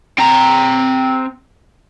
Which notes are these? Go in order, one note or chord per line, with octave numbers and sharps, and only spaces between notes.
C4 A#5